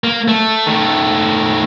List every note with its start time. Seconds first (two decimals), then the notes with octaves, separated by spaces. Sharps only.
0.04 A#3
0.28 A3
0.66 D#3 A3